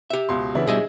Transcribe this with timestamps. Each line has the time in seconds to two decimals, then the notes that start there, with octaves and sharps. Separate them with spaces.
0.10 G4 E5
0.29 C#2 B2 C6
0.55 C#3 E3 B3 C#4 D4 E4
0.67 B2 G3 G#4 D#5 E5